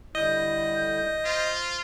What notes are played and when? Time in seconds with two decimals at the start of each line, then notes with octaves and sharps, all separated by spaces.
0.15 D3 G3 E4 D#5 G6
1.25 F4 C5